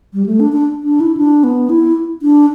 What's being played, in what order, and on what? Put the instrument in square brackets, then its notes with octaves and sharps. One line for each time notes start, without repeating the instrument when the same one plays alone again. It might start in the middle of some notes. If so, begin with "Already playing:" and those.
[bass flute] G3
A3
D4
D4
D4
E4
D4
B3
E4
D4